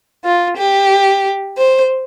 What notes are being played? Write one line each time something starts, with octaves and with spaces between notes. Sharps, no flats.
F4
G4
C5